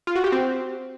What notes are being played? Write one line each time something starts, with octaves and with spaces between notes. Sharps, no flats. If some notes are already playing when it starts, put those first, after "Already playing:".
F4
F#4
G4
C4